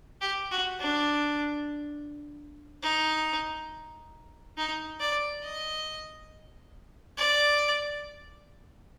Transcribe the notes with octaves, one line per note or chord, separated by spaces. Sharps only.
G4
F#4
D4
D#4
D#4
D5
D#5
D5